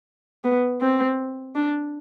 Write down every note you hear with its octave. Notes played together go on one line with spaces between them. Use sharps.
B3
C4
D4